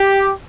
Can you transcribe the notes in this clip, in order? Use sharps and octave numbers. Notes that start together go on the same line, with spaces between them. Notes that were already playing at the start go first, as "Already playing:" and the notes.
Already playing: G4